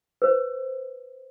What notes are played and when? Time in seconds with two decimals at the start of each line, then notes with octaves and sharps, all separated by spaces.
0.22 B4 C5